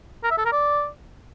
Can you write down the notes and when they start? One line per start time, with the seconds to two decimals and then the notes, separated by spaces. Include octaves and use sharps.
0.24 A#4
0.31 E5
0.38 A4
0.45 A#4
0.52 D5